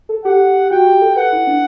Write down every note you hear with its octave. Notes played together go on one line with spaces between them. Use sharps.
A4
G4 F#5
F#4 G5
G4
A4
B4 F#5
E4
D4